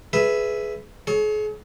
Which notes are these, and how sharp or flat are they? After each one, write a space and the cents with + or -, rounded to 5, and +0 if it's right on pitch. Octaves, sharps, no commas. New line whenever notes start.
G#4 +15 B4 +0 E5 +0
G#4 +40 C#5 +0